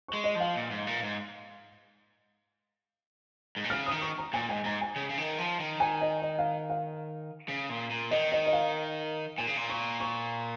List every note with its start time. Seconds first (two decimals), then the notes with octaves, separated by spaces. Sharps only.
0.08 G#3 C#6
0.24 D#5
0.35 F3
0.40 F5
0.56 A#2
0.71 G#2
0.87 A#2
1.03 G#2
3.57 G#2
3.64 A#2
3.70 C#3 F6
3.86 D#3 D#6
4.01 C#6
4.18 A#5
4.33 A#2 G#5
4.49 G#2 G#5
4.65 G#2 A#5
4.81 G#5
4.96 C#3
5.09 C#3
5.17 D#3
5.38 F3
5.60 D#3
5.80 G#5
6.01 D#5
6.22 D#5
6.39 F5
6.70 F5
7.48 C#3
7.69 A#2
7.90 A#2
8.11 D#3 D#5
8.32 D#5
8.46 D#5
8.53 F5
9.38 A#2 G#5
9.47 C#3
9.57 A#2
9.70 C#6
10.00 C#6